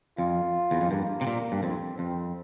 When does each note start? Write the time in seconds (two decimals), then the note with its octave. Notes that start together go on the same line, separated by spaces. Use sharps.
0.18 F2 F4
0.71 E2
0.81 F2
0.90 G2 A#3
1.21 C3
1.27 A#2
1.52 G2
1.63 F2 C4
1.98 F2 C4